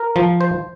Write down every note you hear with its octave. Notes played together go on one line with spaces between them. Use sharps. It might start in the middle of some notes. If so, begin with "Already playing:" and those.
Already playing: A#4
F3
C5